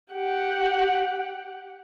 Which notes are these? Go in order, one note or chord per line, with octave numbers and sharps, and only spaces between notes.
G4 F#5